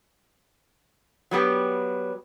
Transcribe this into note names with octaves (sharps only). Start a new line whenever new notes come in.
F#3 G3 B3 G4